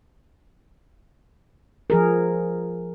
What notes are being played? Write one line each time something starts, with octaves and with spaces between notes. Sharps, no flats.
F3 G#4 A#4